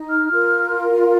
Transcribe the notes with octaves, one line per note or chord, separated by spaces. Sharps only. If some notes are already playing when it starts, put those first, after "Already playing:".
Already playing: D#4
F6
F4 A#4